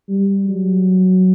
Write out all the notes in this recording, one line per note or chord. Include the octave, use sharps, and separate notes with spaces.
G3
F#3